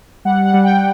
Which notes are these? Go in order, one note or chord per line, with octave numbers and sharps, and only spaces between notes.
G3 F#5
F#5
G3
G5